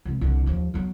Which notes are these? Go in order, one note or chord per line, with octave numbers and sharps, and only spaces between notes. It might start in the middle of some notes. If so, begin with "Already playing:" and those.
C3 G#3
C2 D3
D#2 F3
F#3 B3